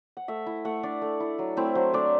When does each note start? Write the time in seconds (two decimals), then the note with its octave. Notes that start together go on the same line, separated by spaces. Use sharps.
0.17 F#5
0.28 A3 E5
0.46 E4
0.65 A3 F#5
0.83 D4 D5
1.02 A3
1.20 E4
1.39 F#3
1.57 A3 C4 E4
1.75 F#3 C5
1.93 A3 D4 D5